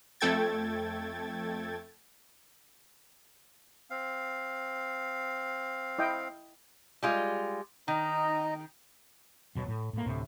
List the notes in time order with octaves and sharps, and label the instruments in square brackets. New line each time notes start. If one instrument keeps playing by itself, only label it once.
[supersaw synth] F2 A3 A4 G5 G#6 A6
[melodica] C4 F5
[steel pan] E4 D#5 G5
[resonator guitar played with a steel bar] G3 G#3 F4
[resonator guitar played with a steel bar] D#3 [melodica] D#4 D#5 A#5
[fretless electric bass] E1 B2 F#3
A2
A2 A#3
D2 A2 C3